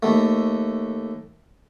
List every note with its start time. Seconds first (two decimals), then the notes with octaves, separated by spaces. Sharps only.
0.03 D#2 A3